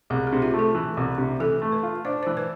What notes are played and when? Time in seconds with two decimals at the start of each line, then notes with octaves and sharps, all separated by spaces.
0.10 C2 G#4
0.27 G#4
0.32 C3
0.42 F4
0.54 A3
0.59 A4
0.75 E3
0.97 C2
1.18 C3
1.40 E3 A4
1.62 A3
1.72 B4
1.83 F4
2.05 D4 C5
2.23 E3 C5
2.37 B4